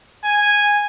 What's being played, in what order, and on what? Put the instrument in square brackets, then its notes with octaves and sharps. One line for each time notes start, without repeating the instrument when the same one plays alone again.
[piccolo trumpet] G#5